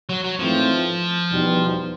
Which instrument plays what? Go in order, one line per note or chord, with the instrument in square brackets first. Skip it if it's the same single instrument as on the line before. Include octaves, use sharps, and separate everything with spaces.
[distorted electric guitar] F#3
F#3
[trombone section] G#2 E3 A3 C4 F4 [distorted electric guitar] F3
[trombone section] E2 B2 G3 B3 D#4